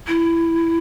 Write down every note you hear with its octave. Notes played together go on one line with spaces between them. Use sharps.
E4